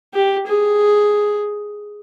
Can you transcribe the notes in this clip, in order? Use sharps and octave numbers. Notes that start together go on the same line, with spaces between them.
G4
G#4